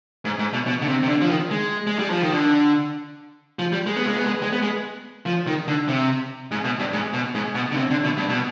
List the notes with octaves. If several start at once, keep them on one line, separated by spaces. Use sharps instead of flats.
G#2
G#2
B2
B2
D3
C3
C3
D3
F3
D#3
G#3
G#3
G3
F3
D#3
D3
F3
G3
G#3
B3
G#3
B3
G#3
G#3
B3
G#3
F3
D#3
D3
C3
G#2
B2
G2
G#2
B2
G#2
B2
D3
C3
D3
B2
G2
B2